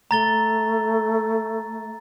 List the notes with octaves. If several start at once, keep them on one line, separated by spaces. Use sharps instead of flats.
A3 A#5 A6 G7